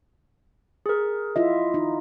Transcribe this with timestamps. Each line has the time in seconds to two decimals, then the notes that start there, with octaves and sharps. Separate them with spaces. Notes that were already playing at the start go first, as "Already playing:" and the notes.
0.86 G#4 A#4
1.36 E4 F4 D#5 E5
1.74 D#4